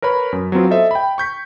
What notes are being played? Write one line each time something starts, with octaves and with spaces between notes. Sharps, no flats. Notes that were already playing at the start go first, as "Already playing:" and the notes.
A#4 B4 C#5 B5
F#2
F#3 B3 C4 F4
A4 C5 D#5 E5
G5 B5
C#6 G6 B6